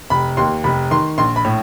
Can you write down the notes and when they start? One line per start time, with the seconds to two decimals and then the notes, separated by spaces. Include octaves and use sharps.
0.10 F1 B5
0.37 D#2 C6
0.64 F1 B5
0.91 D#3 C6
1.18 A#1 C6
1.36 B5
1.45 A2